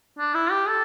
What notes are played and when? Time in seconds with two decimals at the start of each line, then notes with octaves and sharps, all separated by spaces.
0.19 D4
0.34 E4
0.51 G4
0.68 A4